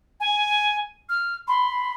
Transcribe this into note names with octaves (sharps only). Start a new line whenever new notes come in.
G#5
F6
B5 C6